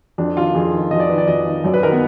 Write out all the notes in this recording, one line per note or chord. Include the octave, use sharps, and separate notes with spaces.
F2 D4
D#3 F4
F2 G#4
D#3
F2 D#5
D5
D#3 B4
D5
F2 D#5
D#3
F#2 D5
B4
D#3 A#4
B3